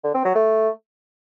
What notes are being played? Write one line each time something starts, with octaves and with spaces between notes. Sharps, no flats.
D3
C4
F#3
A3